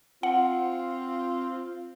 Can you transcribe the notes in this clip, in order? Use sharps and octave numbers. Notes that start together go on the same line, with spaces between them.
C4 F4 F#5